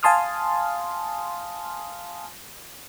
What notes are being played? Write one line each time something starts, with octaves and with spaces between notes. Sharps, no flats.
F5 G#5 A5 C6 D#6 F6